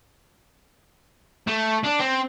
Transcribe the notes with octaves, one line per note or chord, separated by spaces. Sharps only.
A3
D4
C4